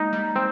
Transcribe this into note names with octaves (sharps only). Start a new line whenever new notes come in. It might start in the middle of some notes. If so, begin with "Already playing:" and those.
Already playing: G#3 A#3 D#4
G3
G#3 C4